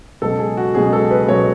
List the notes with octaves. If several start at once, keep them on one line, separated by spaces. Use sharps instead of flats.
C#2 B2 F#3 A4
G#4
F#4
C#2 B2 F#3 G#4
A4
B4
C#2 B2 F#3 C#5